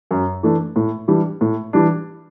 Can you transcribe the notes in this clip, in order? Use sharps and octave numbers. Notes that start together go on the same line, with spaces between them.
F#2
E3 A3 D4
A2
E3 G3 D4
A2
E3 G3 D4